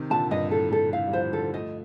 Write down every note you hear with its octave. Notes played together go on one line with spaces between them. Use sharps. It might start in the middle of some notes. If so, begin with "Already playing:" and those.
Already playing: C3 D#3
A#2 D3 A5
G2 A#2 D#5
A2 A4
G2 A4
A2 F5
G3
D3 F3 C5
D3 F3 A4
F3 A3 D#5